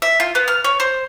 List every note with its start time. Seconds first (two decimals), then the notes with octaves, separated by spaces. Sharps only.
0.02 E5
0.20 F4
0.35 B3
0.48 F6
0.64 C#5
0.80 C5